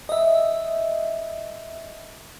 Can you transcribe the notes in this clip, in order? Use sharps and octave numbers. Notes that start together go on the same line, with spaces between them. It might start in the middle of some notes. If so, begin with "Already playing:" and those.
D#5 E5